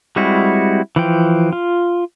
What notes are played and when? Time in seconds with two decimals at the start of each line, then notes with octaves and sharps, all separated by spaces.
0.16 G3 G#3 C4 E4 F#4
0.96 E3 F3 G5
1.53 F4